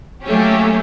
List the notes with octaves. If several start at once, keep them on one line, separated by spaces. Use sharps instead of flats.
F#3 A3 A#3 C#4 G4